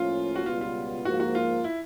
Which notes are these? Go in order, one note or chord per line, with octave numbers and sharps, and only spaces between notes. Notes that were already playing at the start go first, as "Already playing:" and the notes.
Already playing: A2 F3 A#3 C#4 F4
F#4
C#2 B2 G3 B3 F4
F4
G#2 F3 A#3 F#4
F#4
F4
E4